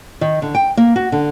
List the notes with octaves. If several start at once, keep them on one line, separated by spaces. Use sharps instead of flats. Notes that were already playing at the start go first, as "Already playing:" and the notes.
D#3
D3
G5
A#3
F#4
D3